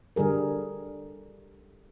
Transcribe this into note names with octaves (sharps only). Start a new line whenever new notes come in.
D3 G3 G#4 A#4